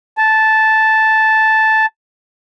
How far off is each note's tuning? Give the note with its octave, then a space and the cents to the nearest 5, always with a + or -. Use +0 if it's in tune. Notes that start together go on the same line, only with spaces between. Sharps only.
A5 -5